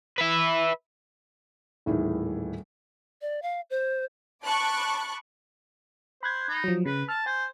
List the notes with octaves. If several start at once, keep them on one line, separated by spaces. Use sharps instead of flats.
B4 E5
D#1 A2 D#3 E3 G#4
D5
F5
C5
A5 B5 C#6 D6 F#6
C5 B5 F#6 G#6
D#4
F3 F#3
C#3 B4
A5 F6
C5 G#5